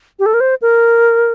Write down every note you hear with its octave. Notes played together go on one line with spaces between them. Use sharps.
G4
A4
A#4
C5
A#4